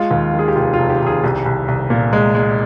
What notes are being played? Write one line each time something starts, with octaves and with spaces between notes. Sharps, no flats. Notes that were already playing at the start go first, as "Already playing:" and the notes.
Already playing: G#3 F4
D#2
D#3
G#4
G4
F1 F4
F1 F4
G4
F1
G#4
C2 G4
C2
C2
A#2
G#3
G#3